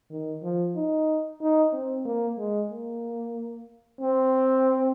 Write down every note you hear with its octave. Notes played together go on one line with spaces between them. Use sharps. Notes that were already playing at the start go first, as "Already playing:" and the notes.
D#3
F3
D#4
D#4
C4
A#3
G#3
A#3
C4